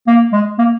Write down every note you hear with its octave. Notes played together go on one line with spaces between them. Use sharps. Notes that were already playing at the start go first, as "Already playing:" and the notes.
A#3
G#3
A#3